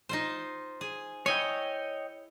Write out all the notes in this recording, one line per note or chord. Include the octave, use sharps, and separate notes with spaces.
D#4 F4 C5
G#4
E4 C#5 D#5 G5 G#5